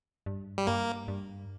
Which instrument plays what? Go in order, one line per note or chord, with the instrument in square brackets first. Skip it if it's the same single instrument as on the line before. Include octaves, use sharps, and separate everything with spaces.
[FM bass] G2
[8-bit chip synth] G3
[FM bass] G2 [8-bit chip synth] A#3
[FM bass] G2